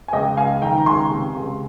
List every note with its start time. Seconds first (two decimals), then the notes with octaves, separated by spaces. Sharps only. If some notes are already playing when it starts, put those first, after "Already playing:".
0.08 G#5
0.12 C#2 D#5 G5
0.37 C#2 F5 G#5
0.62 D#3 G5 A#5
0.78 A#5
0.86 C#2 G#5 C6
1.11 C3
1.36 C#2